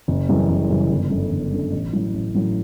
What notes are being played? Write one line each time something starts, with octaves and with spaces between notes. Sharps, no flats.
F#1
F#2 C#3 E3 G3
F#1
F#2 C#3 E3 G3
G1
F#2 D3 A3
G1
F#2 D3 A3
A1
A2 F#3 C#4 E4
A1
A2 F#3 C#4 E4